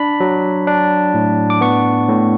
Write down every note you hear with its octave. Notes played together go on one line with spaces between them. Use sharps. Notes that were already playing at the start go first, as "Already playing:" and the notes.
Already playing: D4 B5
F#3
D4
A2
D6
B3 C#6
A2